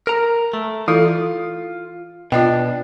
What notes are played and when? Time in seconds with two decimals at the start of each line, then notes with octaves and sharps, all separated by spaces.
0.07 A#4 A#5
0.53 A3
0.88 E3 E4 F4 A4
2.32 B2 D4 F4 D#5 G5